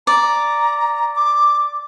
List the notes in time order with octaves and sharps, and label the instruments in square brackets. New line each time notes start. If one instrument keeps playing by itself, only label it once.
[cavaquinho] D5 [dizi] A#5
[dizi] D6